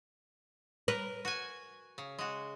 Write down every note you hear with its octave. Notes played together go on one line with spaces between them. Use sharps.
A#4 B4
F#4 G#5
C#3
G#3 F#4